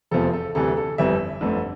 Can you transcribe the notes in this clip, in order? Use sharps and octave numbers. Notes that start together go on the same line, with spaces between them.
F1 E2 C3 F3 A4
A4
D2 C3 E3 G3 A4
A4
G1 F2 E3 G3 E5
G1 F2 D3 A3